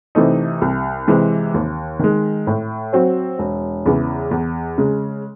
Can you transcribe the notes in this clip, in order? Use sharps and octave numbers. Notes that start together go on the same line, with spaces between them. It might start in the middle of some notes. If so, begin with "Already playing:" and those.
C3 E3 A3 D#4
C2
C3 E3 G#3
D#2
D#3 G#3
A2
F#3 C4 F#4 C5
E1
E2 C#3 E3
E2
C#3 G#3